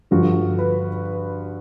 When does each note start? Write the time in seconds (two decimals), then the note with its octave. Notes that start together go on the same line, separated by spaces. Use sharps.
0.11 G2 D3 F3 F#4
0.59 B4